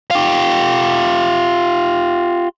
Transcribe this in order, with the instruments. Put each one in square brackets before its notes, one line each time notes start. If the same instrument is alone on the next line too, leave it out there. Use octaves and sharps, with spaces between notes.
[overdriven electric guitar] F4 G4